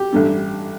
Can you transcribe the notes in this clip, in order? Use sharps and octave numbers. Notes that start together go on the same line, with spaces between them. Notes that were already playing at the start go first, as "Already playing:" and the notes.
Already playing: G4
A1 G2 D3